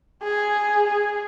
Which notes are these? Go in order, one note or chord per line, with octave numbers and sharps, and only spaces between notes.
G#4
G#4